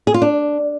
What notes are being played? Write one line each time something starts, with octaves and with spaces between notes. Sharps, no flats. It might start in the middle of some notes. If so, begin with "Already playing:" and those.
G#4
F4
D4